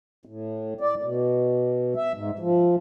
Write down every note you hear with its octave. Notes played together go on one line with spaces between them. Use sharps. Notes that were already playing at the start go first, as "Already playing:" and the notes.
A2
D5
B2
E5
G#2
F3